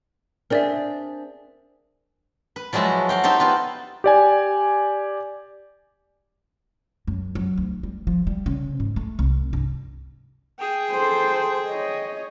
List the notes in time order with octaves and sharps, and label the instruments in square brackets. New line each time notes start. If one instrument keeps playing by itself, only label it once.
[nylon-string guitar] C4 D4 G#4 [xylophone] A#4 D5 E5
[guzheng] B4
F3 F#3 G#3 E4 F#4 A5
F#4 F5 G5
D#4 G4 A4 C5
B3 F4 B4
[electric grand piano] G4 D5 G#5
[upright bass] F#2
F#3
D2
G3
F3
G3
C#3
G#2
A3
C2
G2
[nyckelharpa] G#4 G5
[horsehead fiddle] A4 C5
C#5 D#5